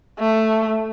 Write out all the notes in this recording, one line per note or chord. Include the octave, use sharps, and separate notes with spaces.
A3